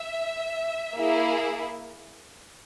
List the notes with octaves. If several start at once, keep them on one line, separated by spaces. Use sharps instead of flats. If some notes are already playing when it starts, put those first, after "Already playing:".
Already playing: E5
A#3 E4 G#4